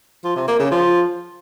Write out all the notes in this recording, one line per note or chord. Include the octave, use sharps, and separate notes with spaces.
F3
C3
A#3
C#3
F3